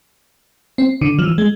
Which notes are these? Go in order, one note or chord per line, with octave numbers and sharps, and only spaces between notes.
C4
D3
F3
E3
G#3